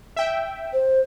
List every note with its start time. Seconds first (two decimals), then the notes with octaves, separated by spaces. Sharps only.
0.16 E5 G5
0.73 C5